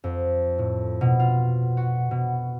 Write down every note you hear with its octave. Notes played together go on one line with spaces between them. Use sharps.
F2
A2
B2
F4
F#4
B2